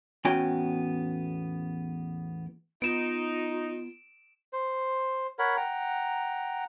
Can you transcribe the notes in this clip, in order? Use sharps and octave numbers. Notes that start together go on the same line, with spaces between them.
E2 A2 B3 C#4 F#4 G5
B3 D#4 F4 D7 E7
C5
A#4 C#5 F#5 B5
F#5 G5 A#5